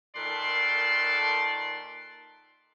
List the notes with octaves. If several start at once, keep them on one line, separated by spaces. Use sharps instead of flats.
A#2 D#3 A4 B4 D5 C6